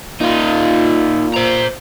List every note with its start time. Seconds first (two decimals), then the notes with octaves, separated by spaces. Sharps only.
0.21 A#2 D#4 F4
1.34 C5 A#5